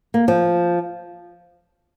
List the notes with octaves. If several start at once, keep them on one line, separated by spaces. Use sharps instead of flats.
A#3
F3